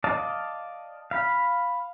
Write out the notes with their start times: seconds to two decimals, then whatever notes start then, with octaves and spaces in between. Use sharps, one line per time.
0.04 D5 D#5 F5 A5
1.11 F5 B5